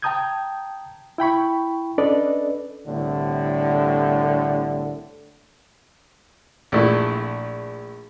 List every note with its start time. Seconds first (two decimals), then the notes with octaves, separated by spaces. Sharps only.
0.02 G5 A5 A#5 D#6 G6 G#6
1.18 E4 G5 B5 C#6
1.98 C#4 D4 A4 B4 D5 D#5
2.87 C2 A2 D3
6.72 A#1 A3 E4